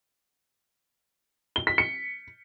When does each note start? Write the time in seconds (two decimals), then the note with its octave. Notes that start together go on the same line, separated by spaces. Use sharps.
1.56 G7
1.67 B6
1.78 C#7